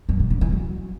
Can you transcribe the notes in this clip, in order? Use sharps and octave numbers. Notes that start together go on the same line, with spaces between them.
F#2
C3
D3
E3
F#3